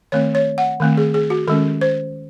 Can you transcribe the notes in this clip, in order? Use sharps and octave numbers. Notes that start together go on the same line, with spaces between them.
D#3 A3 C4 C#5
C#5
F#5
D#3 A3 C4
G#4
G#4
F#4
D#3 G#3 C#4 A4
C5